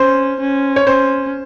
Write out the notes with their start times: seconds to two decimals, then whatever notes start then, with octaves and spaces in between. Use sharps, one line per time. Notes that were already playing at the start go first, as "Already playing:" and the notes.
Already playing: C#4 C5
0.40 C#4
0.76 C#5
0.87 C#4 C5